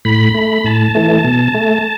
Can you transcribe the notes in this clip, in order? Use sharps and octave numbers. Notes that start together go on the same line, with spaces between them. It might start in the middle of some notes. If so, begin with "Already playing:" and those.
A2 B5
A3
A2 A5
E3 A3
B2
A3